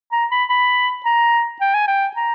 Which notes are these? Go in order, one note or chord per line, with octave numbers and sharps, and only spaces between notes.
A#5
B5
B5
A#5
G5
G#5
G5
A#5